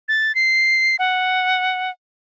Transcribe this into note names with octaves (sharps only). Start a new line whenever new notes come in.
A6
C7
F#5